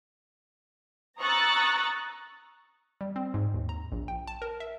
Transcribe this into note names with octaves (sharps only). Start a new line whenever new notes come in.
A#5 C#6 D#6 E6 F#6 A6
G3
C4
G#2
D#2
A#5
A#1
G5
A5
A#4
E5